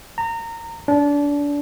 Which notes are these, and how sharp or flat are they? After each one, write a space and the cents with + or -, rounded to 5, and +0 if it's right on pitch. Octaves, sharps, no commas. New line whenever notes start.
A#5 -25
D4 -25